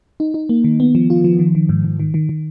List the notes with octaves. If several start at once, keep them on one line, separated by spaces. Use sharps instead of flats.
D#4
D#4
A#3
D#3
B3
F3
F4
F3
D#3
D#3
G#2
G#2
D#3
D#3
D#3